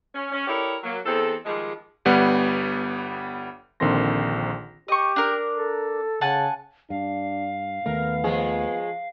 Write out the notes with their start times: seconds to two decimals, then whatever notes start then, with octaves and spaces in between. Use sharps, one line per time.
0.14 C#4
0.32 C#4
0.47 E4 G4 A4 A#4 C#5 D5
0.84 F#3 A#3
1.04 E2 C4 A4
1.45 D#3 F3 G3 G#3
2.05 G1 G3 B3 F#5
3.80 A#1 D3 D#3 C4 C6 A#6
4.88 G4 D#5 C#6
5.16 D4 A#4
5.54 A4
6.21 C#3 F#5 G#5 A5
6.90 G2 D4 F5
7.86 D#2 D#3 A3 B3 A#4
8.24 F3 G#3 G#4